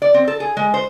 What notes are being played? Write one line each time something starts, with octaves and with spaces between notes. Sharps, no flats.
D5
C4
A4
G#4
G#3
C5